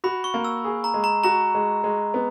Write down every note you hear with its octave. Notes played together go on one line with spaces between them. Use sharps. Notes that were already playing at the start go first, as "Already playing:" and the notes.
F#4 B5
C#6
A#3
E6
G#4
A#5
G#3
A#5
F#4 A#5
G#3
G#3
B3